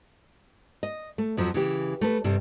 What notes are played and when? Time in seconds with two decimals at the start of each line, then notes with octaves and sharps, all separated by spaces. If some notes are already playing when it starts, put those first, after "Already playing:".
0.83 D#5
1.18 A3
1.37 F2 F3 F#3
1.54 C#3 E3 G4
2.01 A3 A#4 B4
2.24 G2 C3 G3